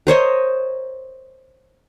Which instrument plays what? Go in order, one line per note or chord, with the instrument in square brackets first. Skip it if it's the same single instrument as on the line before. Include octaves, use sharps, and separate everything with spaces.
[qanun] A#4 C5 C#5 D#5